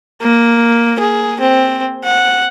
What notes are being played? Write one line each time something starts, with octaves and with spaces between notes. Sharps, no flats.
A#3
G#4
C4
F#5